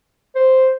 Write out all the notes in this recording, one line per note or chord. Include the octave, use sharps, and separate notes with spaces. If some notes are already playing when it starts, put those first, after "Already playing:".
C5